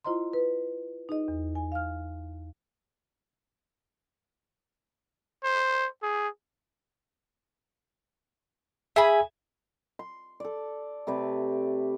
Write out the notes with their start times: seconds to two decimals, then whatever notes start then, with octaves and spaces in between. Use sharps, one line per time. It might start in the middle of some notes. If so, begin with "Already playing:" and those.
0.04 E4 F4 C5 D#5 A#5 C6
0.33 B4
1.09 D#4 G#4 D#5
1.28 E2
1.55 G#5
1.72 F5 F6
5.44 C5
6.03 G#4
8.96 G#4 E5 G#5 B5
9.99 C6
10.40 A4 D5
11.07 C3 A3 B4 D5